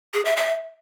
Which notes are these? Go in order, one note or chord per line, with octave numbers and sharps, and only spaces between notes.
G#4
E5
E5